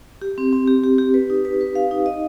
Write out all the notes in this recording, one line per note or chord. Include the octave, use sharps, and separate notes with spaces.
G4
C4
C4
G4
G4
G4
B4
D#4
B4
B4
F5
D#4
D#5